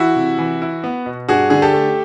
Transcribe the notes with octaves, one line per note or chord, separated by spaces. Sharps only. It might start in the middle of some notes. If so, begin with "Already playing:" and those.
Already playing: E3 E4 F#4
C3
E3
E4
B3
B2
G2 F#4 G#4
D3 G#4
G4 A4
A3